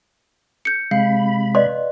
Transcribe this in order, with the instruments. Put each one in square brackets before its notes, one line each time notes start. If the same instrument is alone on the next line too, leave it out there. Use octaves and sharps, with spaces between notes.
[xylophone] G6 C#7
[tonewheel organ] C3 B5 [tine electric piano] G#3 [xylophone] F5
[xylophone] B4 [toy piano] D5 D#5 C6